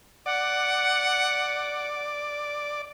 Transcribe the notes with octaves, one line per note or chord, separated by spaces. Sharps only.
D5 F#5